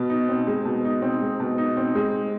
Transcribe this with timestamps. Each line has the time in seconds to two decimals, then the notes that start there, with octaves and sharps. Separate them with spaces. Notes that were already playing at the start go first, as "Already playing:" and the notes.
Already playing: B2
0.10 D#4
0.29 C4
0.47 G#3
0.65 B2
0.85 D#4
1.02 C4
1.21 G#3
1.40 B2
1.58 D#4
1.77 C4
1.95 G#3